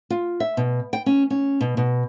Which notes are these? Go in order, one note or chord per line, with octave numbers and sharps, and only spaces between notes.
F4
E5
B2
G5
C#4
C#4
B2
B2